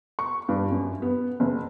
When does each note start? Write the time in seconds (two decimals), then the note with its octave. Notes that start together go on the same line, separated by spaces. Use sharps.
0.19 C#6
0.49 G2
0.71 F#2
1.02 B3
1.40 F#1